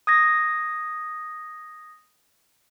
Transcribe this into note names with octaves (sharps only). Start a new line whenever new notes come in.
D#6 G#6 A#6